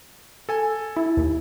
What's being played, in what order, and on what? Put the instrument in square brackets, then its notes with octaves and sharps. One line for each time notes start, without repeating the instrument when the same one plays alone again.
[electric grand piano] A4 G#5
[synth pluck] E4
D#2